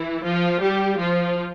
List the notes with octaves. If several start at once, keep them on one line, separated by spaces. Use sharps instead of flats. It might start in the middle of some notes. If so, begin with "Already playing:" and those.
Already playing: E3 E4
F3 F4
G3 G4
F3 F4